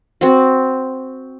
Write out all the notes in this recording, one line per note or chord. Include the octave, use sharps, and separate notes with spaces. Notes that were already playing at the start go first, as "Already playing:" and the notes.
C4 F#4